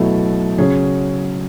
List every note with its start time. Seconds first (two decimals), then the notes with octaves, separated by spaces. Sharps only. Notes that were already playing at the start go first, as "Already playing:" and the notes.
Already playing: B2 F#3 A3 E4 A4
0.58 C#3 F#3 C#4 G#4